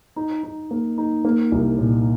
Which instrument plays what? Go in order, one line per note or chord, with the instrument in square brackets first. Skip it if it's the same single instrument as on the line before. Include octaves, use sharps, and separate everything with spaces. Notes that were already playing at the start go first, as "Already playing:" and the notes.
[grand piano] D#4
D#4
A#3
D#4
A#3
C2
A#2